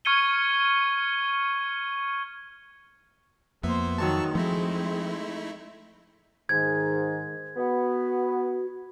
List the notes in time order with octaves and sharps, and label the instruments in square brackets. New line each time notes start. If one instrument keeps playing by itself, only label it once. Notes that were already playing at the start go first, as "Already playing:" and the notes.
[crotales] C#6 F6 G#6 C#7 D#7 G7
[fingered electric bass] F2 [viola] A#3 C5 [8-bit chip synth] B3 E5
[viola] D#3 F#3 [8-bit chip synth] A5 C#6 E6
[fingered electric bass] F3 [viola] G#3 C4 [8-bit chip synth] A3 D#4 E4
[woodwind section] G#2 [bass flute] D#3 [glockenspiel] G#6
[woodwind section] B3 [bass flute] F#4